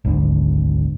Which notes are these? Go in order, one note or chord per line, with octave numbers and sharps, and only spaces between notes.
G#1 D2